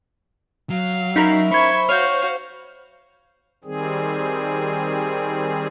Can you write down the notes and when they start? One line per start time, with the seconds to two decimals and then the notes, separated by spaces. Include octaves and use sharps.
0.70 F#3 F5
1.16 C#4 D#4 E4 A#4 C7
1.51 C5 E5 B5 C#6 G#6
1.89 F#4 C#5 F5 F6 G6
3.64 D#3 G3 C4 G#4